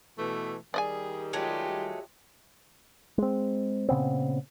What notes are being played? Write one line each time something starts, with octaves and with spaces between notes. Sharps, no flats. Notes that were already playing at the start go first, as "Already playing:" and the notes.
B2 E3 A3
D#3 G3 G#4 D5 D#5 G#5
F#3 G#3 A3 F4 G4
G#3 C4
A#2 C#3 B3 C4